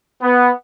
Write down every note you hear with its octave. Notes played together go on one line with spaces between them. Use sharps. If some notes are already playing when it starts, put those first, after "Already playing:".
B3